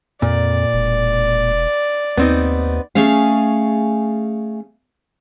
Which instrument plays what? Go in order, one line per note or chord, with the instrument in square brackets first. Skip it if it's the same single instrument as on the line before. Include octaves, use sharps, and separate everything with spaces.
[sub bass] F2 [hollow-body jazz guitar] A#2 [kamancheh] D5
[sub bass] E1
[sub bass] D#2 [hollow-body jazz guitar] B3 C4 D#4
[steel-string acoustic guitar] A3 C#4 G#4 F5